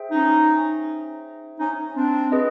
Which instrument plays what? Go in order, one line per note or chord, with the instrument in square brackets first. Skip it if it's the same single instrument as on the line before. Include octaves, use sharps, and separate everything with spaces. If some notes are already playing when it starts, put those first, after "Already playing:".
Already playing: [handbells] G#4 C5 E5 G5
[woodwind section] C#4 D#4
C#4 D#4
C4 D4
[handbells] G#4 B4 D#5